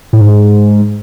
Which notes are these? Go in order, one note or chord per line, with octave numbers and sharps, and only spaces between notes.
A2
G#2